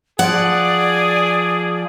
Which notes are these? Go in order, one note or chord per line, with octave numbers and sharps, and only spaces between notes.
F3 G#4 D5 F#5